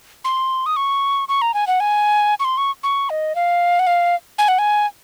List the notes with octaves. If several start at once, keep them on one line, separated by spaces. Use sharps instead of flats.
C6
D#6
C#6
C#6
A#5
G#5
F#5
G#5
C#6
C6
C#6
C#6
D#5
F5
F#5
F5
G#5
F#5
G#5